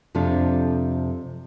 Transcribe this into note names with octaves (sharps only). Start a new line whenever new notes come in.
F2 C3 D4 F4 A4